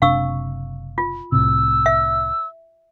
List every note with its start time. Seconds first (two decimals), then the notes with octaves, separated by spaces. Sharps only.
0.02 F#1 C3 D4 F5 C#6 E6
0.98 F4
1.32 C2 A2 C3 E6
1.86 E5